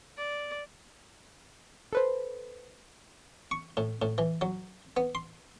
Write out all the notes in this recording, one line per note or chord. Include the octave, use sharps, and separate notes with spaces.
D5
A4 B4 C5
C#6
A2
A2
E3
F#3
B3
C6